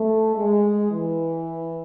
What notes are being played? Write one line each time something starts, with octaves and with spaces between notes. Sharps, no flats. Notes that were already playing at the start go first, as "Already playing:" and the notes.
Already playing: A3
G#3
E3